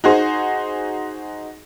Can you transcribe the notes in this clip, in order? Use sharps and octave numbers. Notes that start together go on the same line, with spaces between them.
D#4 F#4 G#4 C5